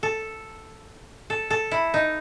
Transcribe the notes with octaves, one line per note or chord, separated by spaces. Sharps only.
A4
A4
A4
E4
D#4